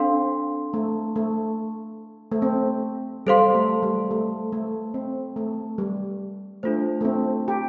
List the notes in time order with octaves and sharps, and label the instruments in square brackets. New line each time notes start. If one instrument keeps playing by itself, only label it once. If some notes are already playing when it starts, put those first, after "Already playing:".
Already playing: [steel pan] C4 [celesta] D4 A4 F5 C6
[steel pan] A3
A3
A3
C4
[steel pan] G3 [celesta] A4 C5 F5 C6
[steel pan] A3
G3
A3
A3
C4
A3
G3
[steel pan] A3 [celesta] D4 F4 C5
[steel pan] A3
C4
G4